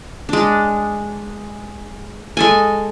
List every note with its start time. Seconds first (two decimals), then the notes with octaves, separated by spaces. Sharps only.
0.29 G#3 D4
2.37 G#3 A4 G#5